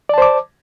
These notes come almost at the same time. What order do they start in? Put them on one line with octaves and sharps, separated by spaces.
D5 A5 C5 D6